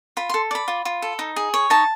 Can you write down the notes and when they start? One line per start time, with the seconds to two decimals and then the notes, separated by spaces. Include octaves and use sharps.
0.17 F4 B5
0.29 A4 C6
0.51 D5 B5
0.68 F4
0.85 F4
1.02 A4
1.19 D#4
1.36 G#4
1.54 C#5
1.70 D#4 A5